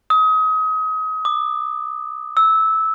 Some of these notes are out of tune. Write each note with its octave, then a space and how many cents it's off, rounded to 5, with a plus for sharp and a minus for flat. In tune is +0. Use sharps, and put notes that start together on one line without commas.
D#6 +30
D6 +40
E6 -15